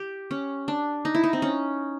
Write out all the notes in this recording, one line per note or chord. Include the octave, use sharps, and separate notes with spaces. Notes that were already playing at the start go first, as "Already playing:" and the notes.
Already playing: G4
C#4
D4
D#4
E4
D#4
C4
C#4